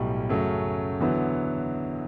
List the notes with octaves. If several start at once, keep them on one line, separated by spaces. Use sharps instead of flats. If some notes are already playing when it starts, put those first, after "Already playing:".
Already playing: B1 A2 G3
F#2 C#3 F#3 A3
E2 D3 F#3 B3 E4